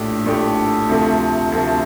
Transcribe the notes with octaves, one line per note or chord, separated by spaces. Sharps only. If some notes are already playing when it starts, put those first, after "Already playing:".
Already playing: A#1 A2 A3 D4 G4
A#1 A2 A3 D4 G4
D2 C3 F3 A3
D2 C3 F3 A3